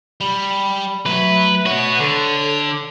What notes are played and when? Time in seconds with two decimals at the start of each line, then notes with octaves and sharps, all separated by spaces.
0.21 G3 B5
1.06 F#3 A3 B4 E5
1.66 B3 F#4 C#5
2.00 D3 A4